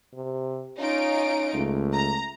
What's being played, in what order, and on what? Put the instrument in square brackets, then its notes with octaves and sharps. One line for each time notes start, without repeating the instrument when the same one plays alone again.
[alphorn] C3
[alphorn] C#4 [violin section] D#4 F4 D7
[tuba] C#2 [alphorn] A3
[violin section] A#5